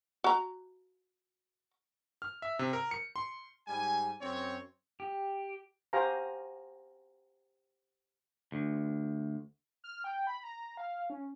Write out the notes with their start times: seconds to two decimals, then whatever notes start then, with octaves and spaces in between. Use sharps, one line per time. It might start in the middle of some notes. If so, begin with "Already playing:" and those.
0.24 F#4 A#5
2.22 F6
2.42 E5
2.59 C3
2.73 A#4
2.91 C#7
3.16 C6
3.67 G#2 G3 G#5
4.20 F#2 C4 C#5
5.00 G4
5.93 F#4 G4 C5 F5 G#5 A#5
8.52 D2
9.84 F6
10.04 G5
10.27 B5
10.43 A#5
10.77 F5
11.10 C#4